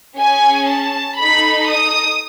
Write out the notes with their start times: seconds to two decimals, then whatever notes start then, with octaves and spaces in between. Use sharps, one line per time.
0.17 C#4 G#4 G#5
0.68 A5
1.19 D#4 A4 B5
1.69 D#6